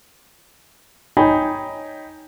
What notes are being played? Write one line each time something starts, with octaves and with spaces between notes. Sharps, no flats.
D#4 C#5 D#5 G5 G#5 B5